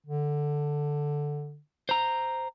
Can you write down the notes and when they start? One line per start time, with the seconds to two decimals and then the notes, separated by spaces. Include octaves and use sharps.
0.07 D3
1.89 C5 A#5